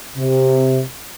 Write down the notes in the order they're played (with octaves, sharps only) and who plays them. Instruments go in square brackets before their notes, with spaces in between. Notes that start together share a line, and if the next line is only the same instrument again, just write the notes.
[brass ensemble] C3